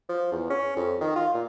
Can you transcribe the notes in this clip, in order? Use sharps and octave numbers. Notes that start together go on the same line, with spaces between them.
F3
E2
C#4
F2
D#3
F4
A#2